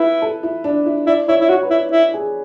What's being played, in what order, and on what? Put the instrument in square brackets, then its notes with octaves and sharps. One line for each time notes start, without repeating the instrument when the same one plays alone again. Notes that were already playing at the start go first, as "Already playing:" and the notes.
Already playing: [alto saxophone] E4 [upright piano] B4
[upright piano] A4
E4
D4
E4
[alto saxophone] E4 [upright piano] D5
[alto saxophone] E4 [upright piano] C#5
[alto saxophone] E4
[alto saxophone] F#4 [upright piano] C#5
[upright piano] B4
[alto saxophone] E4 [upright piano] C#5
[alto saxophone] E4
[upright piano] G#4